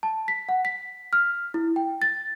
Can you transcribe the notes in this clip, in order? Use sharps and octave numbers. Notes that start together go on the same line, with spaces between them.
A5
B6
F#5
B6
F6
E4
G5
A6